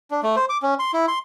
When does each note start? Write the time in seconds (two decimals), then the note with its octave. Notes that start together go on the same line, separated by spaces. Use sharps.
0.11 D4
0.23 A3
0.36 C5
0.49 D6
0.62 C#4
0.79 C6
0.94 E4
1.08 C6